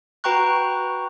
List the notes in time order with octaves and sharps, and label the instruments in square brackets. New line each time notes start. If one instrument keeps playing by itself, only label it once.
[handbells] F#4 B4 G5 A#5 C#6 F#6